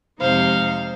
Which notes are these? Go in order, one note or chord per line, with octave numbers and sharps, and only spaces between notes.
F2 C3 G#3 D#4 C5 F5